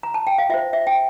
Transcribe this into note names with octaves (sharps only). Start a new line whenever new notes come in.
A#5
A5
G5
F5
F4 C5 E5
E5
G5